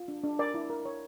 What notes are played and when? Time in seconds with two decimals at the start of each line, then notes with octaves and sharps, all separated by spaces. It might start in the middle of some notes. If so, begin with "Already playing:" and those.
Already playing: F4
0.08 D4
0.23 D4
0.39 A#4 D5
0.54 E4
0.70 A#4
0.85 C#5